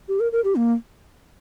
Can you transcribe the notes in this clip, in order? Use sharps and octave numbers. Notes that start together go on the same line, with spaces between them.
G4
A#4
A#4
G4
A#3